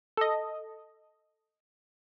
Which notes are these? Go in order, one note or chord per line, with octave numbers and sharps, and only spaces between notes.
A4 D#5